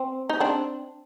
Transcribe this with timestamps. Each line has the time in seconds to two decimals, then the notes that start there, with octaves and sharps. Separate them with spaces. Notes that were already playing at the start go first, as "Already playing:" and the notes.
Already playing: C4
0.29 D#4
0.40 C4 D4